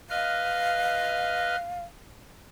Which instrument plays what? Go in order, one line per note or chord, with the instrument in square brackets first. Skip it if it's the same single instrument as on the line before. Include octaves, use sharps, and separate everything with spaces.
[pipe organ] B4 D#5 F6 [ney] F5